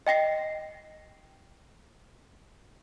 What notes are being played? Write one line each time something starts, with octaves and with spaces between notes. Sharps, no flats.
D#5 G5 A#6 C7